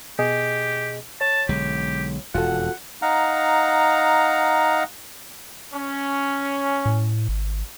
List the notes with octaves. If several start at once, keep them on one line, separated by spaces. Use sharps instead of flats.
B2 G4 G#4 D#5
C#5 A5
B1 D3 G#3 G4
E1 F2 F4 F#4 A4 F#5
D#4 F5 F#5 A#5
C#4
A2
G#1